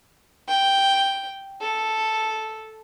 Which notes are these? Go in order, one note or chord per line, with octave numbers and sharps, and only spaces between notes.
G5
A4